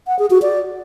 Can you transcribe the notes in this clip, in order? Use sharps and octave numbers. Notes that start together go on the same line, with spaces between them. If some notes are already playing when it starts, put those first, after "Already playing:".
F#5
G#4
F#4
D5